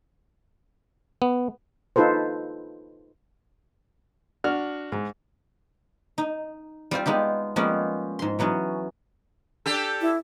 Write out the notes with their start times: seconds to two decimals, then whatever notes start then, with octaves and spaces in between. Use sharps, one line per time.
1.22 B3
1.96 D#4 F4 A4 B4 C5
4.44 D4 F#4 F6
4.92 G#2
6.18 D#4
6.91 G3 C4 F4 C5
7.06 G#3 B3 D#4 G4
7.56 F3 G3 G#3 A#3 B3 C#4
8.19 G#2 C6
8.39 E3 F#3 B3 C#4
9.66 D4 G4 A4
10.01 E4